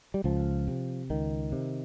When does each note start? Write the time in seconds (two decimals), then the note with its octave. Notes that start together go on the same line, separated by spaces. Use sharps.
0.14 G3
0.24 C#2 F3
0.68 C3
1.10 C#2 D#3
1.52 C3